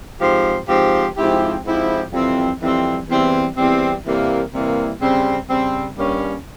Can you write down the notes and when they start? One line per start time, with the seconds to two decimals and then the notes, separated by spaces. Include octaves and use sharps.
0.20 G#2 F3 C4 G4 C5
0.68 G#2 F3 C4 G4 C5
1.16 G#2 F3 C4 E4 G4
1.64 G#2 F3 C4 E4 G4
2.13 F2 E3 G3 C4
2.61 F2 E3 G3 C4
3.08 E2 E3 G3 C4
3.56 E2 E3 G3 C4
4.05 C3 E3 G3 A#3
4.53 C3 E3 G3 A#3
5.01 C#3 G3 C4
5.49 C#3 G3 C4
5.97 G2 G3 A#3 C#4